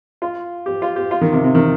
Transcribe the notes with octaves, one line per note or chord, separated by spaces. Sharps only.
F4
G4
F4
G4
F4
D#3
C3
C3
D#3